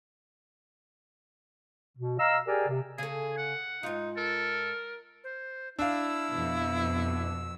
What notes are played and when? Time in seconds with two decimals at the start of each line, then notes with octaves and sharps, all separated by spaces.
1.97 B2
2.18 D#5 F5 A#5 E6
2.46 G4 G#4 A#4 D5 G5 G#5
2.67 C3
2.98 C#3 G#4 A4
3.37 F#5
3.83 G#2 D#4 F4
4.17 A4 A#4
5.24 C5
5.79 D4 E4 F5 E6
6.30 F2 B2